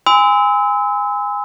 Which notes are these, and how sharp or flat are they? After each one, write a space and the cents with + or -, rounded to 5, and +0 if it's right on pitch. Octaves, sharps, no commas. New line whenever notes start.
G#5 -20 C6 -40 E6 -30